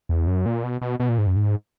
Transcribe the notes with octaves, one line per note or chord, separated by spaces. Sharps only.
E2
F#2
A#2
B2
B2
B2
A#2
G#2
F#2
G#2